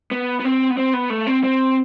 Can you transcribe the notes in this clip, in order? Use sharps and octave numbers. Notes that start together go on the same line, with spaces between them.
B3
B3
C4
B3
C4
B3
A3
C4
C4